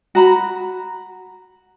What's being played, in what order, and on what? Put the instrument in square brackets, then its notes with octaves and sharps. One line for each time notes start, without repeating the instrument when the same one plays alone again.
[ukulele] F#4 A#5 B5